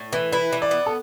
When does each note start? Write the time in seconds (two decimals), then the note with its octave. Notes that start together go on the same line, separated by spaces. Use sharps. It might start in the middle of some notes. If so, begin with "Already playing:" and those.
Already playing: A2
0.13 E3 B4
0.32 E4 B4
0.52 E3
0.62 D5
0.71 B3
0.86 A4